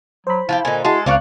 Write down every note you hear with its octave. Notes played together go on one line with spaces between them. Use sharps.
F#3 C5 B5
F3 E4 F#4 G4
A#2 D3 D#4 G#5
G#3 E4 F#4 A4 C6
C#2 C4 F4 A#4 D5 C#6 F#6